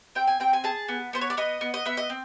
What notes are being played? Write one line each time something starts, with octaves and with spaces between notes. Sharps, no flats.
C4 G5
G#5
C4 G5
G#5
G#4 A5
B3
B3 C5
C#5
D5
B3 D#5
B3
D#5
B3 E5
D#5
C4